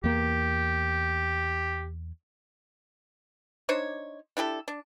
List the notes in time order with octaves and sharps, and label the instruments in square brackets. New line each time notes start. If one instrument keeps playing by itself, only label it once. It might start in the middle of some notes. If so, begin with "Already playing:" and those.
[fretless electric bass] E2 A#3 [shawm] G4
[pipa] D4 D#4 C5 C#5
D4 E4 G4 A4
D4